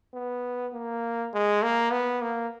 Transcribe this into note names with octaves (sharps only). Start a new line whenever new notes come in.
B3
A#3
G#3
A#3
B3
A#3